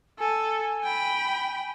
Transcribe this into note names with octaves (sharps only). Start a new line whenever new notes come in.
A4 G#5
G5 B5